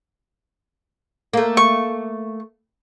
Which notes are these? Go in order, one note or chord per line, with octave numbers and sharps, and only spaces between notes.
A3 A#3
C#6